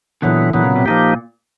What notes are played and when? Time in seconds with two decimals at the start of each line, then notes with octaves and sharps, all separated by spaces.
0.22 A#2 D3 E3 F#3 B3
0.54 A#2 D3 E3 F#3 B3
0.64 C#3
0.76 C3
0.86 A#2 F3 A#3 D#4 G4